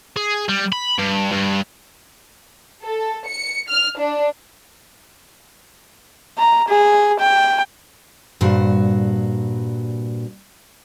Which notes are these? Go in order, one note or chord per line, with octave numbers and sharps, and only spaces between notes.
G#4
G3
B5
G2
G2
A4
C#7
F6
D4
A#5
G#4
G5
G2 A#2 F#4 C5